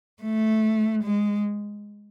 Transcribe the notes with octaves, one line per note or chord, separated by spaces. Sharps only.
A3
G#3